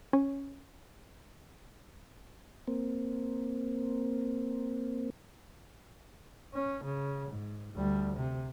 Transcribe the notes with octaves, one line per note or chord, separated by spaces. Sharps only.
C#4
A#3 C4
C#4
C#3
G#2
D2 G3
C3